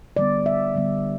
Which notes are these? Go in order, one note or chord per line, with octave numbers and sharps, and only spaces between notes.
D3 G3 B3 D5
E5
D3 G3 B3